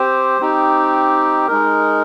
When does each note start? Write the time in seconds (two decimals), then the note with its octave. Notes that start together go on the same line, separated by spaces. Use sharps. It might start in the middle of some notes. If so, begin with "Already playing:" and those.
Already playing: C4 G4 C5
0.41 C4 D#4 G4
1.48 G#3 D#4 A#4